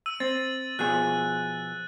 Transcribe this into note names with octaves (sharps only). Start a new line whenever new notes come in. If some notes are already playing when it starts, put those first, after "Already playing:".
E6 D#7
C4 A6
B2 F3 G#4 F#6